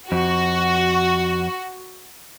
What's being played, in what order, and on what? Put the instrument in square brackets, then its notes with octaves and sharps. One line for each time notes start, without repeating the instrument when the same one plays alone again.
[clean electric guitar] F2 [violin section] F#4